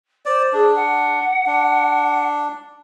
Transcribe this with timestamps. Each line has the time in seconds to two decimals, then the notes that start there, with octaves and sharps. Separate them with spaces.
0.26 C5 D5
0.53 D4 G#4
0.74 F#5
1.46 D4